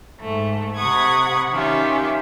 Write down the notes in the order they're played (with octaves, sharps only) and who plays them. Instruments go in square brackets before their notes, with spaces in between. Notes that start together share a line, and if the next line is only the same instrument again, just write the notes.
[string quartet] G#2 A3
C3 F#5 B5 C#6 D#6 G#6
D#3 C#4 F4 G4 E5